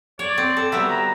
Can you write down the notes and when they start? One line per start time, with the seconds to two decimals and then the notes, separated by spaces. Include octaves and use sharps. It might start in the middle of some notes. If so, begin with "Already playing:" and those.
0.19 C#5 D5
0.38 C4
0.57 A4
0.72 F#3 G3 B3 E5
0.90 A#5